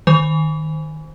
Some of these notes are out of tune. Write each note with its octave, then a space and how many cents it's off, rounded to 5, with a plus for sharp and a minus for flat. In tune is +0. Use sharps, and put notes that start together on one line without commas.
D#3 +0 C5 +0